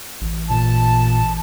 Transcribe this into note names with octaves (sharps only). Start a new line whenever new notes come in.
A1
A#2 A5